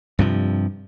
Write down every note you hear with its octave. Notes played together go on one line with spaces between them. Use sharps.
G2 C3 F3